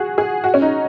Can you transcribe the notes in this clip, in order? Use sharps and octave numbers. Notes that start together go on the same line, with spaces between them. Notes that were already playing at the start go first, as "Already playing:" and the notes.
Already playing: F#4 G#4
G#4
F#4
C#4
D#4